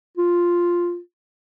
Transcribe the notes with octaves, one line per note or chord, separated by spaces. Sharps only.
F4